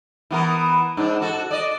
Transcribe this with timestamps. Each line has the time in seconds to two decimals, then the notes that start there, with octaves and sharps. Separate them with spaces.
0.31 E3 B3 A#4
0.97 G#2 D4
1.21 F#4 A4
1.51 D5 D#5